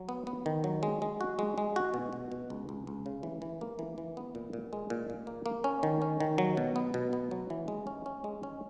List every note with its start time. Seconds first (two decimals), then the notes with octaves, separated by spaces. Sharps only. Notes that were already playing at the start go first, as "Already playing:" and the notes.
Already playing: F#3
0.09 B3
0.27 B3
0.46 D#3
0.64 F#3
0.83 G#3
1.02 G#3
1.21 F#4
1.39 G#3
1.58 G#3
1.76 F#4
1.94 B2
2.13 B2
2.32 B2
2.50 C#2
2.69 C#2
2.87 C#2
3.06 C#3
3.23 E3
3.42 E3
3.61 A#3
3.79 E3
3.98 E3
4.17 B3
4.35 A#2
4.53 A#2
4.73 G#3
4.90 A#2
5.10 A#2
5.27 A#3
5.46 A#3
5.64 C#4
5.83 D#3
6.02 C#4
6.20 D#3
6.38 F#3
6.57 B2
6.76 B3
6.94 B2
7.13 B3
7.31 F#3
7.50 E3
7.68 G#3
7.87 C#4
8.06 C#4
8.24 G#3
8.43 C#4